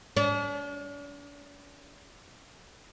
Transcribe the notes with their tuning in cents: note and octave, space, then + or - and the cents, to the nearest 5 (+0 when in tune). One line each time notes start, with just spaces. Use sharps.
D4 -45